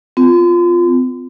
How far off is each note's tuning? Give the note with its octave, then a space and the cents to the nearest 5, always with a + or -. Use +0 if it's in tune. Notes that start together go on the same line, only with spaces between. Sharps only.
C4 -40 F4 +0